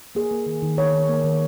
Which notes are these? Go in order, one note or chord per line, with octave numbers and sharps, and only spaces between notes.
A#3 G#4
A#3
D#3
D#3
D#3 C#5
D#3
A#3
D#3